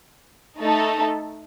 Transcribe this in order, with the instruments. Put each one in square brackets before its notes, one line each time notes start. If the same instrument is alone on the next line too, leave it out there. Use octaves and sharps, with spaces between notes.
[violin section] A3 D#4 A4